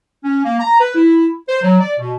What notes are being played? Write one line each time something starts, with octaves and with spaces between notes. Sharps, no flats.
C#4
A#3
A#5
B4
E4
C5
F#3
D5
B2